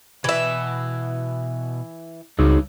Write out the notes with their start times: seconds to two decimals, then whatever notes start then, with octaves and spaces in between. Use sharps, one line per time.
0.24 B2 E3 B4 E5
2.39 C#2 G2 D#4 F#4 G#4